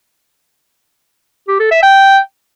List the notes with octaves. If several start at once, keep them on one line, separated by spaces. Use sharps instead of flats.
G4
A4
E5
G5